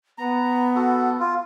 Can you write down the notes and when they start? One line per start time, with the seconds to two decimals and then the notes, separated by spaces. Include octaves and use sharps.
0.18 B3 A#5
0.75 F#4 A4
1.19 F4